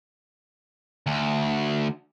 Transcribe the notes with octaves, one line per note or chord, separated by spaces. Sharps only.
D2